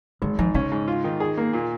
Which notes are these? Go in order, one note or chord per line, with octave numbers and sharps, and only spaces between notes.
G#1 G#3
G#2 F3
C#3 C#4
G#2
F4
D#3
G#4
A#3
A#2